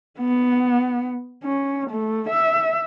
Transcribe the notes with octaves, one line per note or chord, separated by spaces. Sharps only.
B3
C#4
A3
E5